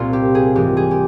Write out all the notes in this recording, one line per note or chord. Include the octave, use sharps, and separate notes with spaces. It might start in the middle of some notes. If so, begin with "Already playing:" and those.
Already playing: C2 A#2 F4
G4
G#4
G#2 E3 G#3 G4
G#4
G4